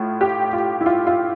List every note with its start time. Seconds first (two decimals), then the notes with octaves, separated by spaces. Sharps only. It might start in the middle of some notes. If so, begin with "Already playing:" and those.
Already playing: A2 F4
0.21 G4
0.53 F4
0.81 E4
0.86 F4
1.07 F4